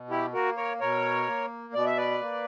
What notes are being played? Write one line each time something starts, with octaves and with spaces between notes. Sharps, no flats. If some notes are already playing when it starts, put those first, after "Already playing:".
Already playing: B2
E4 G4
A#3 F#4 A#4
A#4 C#5
B2 A#4 C#5
A#3
B2 D5
E5
B4 D5
A#3